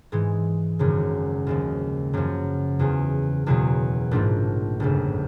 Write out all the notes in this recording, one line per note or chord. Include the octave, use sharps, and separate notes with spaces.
G#2 E3 G#3
G#1 F#2 C#3
D#2 C#3 F3
F#2 C#3 F3
E2 C#3 F3
F#1 E2 B2 F#3
A#1 G#2 F3 A3 D4
G1 F2 C#3